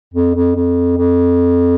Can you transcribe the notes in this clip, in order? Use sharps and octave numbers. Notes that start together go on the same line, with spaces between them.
F2
F2
F2
F2